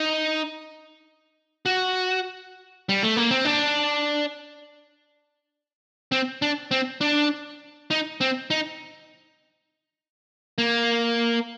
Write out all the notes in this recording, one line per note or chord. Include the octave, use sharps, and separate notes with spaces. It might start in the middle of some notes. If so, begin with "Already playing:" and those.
Already playing: D#4
F#4
G3
A3
A#3
C4
D4
C4
D4
C4
D4
D#4
C4
D#4
A#3